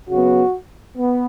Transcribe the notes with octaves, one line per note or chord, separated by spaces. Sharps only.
C#3 F#3 B3 F#4
B3